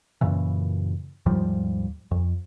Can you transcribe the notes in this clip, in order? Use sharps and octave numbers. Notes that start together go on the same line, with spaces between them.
F#2 A#2 C#3 E3
D#2 G#2 F3 G3
F2